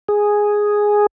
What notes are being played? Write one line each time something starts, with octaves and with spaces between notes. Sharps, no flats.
G#4